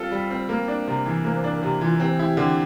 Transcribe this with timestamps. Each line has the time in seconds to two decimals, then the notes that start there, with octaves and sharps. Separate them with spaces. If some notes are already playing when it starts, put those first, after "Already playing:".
Already playing: G3 C4 F4 A4
0.11 G3
0.30 C4
0.49 A#3
0.68 D4
0.88 C3
1.06 E3
1.24 A#3 C5
1.43 D4 A#4
1.63 C3 G4
1.81 E3 F4
2.00 C4 G4
2.19 E4
2.37 D3